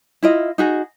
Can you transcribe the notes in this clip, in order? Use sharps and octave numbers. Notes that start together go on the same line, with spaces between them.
E4 F4 D#5
D#4 F#4 G#4